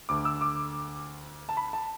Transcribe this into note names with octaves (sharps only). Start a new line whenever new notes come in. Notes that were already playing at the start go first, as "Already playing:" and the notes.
D2 D3 A3 D6
E6
D6
A5
B5
A5